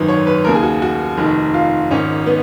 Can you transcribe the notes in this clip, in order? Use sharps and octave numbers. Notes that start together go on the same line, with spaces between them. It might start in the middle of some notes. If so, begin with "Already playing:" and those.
Already playing: G#1 F#2 D#3 B4
C#5
B4
D#2 C#3 A#4
G#4
F#4
F#4
F1 F2 D#3
F4
G#1 G#2 D#3 C#4
B3